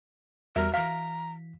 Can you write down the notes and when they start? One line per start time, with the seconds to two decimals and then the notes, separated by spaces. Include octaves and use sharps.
0.56 E2 G3 F#4 A#4 E5 A#6
0.74 E3 F5 A#5 B6